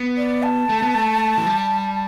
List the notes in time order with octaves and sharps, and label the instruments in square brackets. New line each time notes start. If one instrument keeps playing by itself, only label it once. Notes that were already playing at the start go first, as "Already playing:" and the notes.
Already playing: [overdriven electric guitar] B3
[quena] D5
A5
[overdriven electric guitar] A3
B3
A3
E3
G3